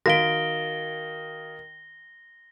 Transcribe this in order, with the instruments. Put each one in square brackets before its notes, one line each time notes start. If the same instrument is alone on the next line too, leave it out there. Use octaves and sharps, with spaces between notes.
[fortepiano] D#3 [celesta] F#4 F5 D7 [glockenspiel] A#6 G7